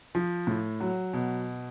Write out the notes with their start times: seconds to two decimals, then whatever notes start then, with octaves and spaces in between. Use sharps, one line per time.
0.15 F3
0.47 A2
0.80 F#3
1.13 B2